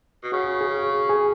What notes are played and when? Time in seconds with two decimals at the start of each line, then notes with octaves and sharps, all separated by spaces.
0.23 B2
0.32 C#3 F#4
0.61 G#4
1.09 G#4